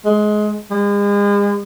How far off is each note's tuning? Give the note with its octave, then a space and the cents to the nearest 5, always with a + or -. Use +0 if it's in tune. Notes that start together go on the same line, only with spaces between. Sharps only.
G#3 +20
G#3 -40